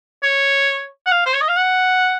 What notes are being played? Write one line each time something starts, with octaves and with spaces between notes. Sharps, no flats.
C#5
F#5
F5
C5
C#5
D#5
F5
F#5